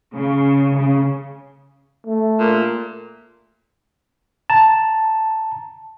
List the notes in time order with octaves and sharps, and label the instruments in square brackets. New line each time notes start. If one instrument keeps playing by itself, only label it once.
[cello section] C#3
C#3
[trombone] A3
[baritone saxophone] A#2
[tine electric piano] A5 A#5